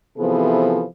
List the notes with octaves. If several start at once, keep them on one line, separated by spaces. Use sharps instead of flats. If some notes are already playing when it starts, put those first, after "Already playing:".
C3 E3 F3 B3 G#4 A4